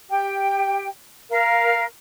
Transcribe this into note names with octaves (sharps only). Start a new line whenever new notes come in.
G4 G5
A#4 F5